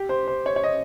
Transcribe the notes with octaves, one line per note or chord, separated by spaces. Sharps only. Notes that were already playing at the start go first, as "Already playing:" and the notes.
Already playing: G4
C5
C5
C#5
C#5
D#5